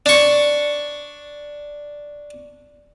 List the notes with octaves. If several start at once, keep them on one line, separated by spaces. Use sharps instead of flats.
D4 C#6